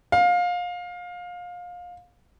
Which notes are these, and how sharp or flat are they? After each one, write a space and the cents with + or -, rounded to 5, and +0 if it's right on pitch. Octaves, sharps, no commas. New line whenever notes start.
F5 +25